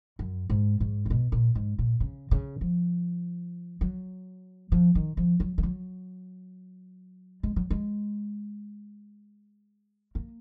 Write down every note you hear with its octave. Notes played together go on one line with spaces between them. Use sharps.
F#2
G#2
G#2
A#2
B2
A#2
G#2
A#2
C#3
C#3
F3
F#3
F3
D#3
F3
F#3
F3
F#3
G#3
F#3
G#3
A#3